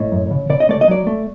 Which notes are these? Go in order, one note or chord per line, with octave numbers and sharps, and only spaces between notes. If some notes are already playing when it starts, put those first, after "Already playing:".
Already playing: A2 D#5
F#2
C#3
C#3 D5
D#5
A3 D5
D#5
F#3 D5
A3